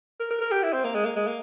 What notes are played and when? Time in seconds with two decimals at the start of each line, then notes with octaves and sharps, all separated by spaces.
0.20 A#4
0.31 A#4
0.41 A#4
0.51 G4
0.63 E4
0.73 C4
0.84 A#3
0.95 G#3
1.05 A#3
1.16 G#3
1.27 A#3